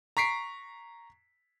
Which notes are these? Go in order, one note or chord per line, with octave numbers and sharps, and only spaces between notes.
A#5 C#6 B6 C7 D7